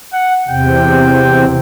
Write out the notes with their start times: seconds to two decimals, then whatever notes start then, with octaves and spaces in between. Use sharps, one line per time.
0.13 F#5
0.48 E2 C3 G5